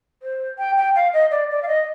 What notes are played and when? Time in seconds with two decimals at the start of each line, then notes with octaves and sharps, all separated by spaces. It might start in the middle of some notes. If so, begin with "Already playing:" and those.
0.23 C5
0.58 G5
0.77 G5
0.95 F5
1.13 D#5
1.31 D5
1.50 D5
1.63 F5
1.68 D#5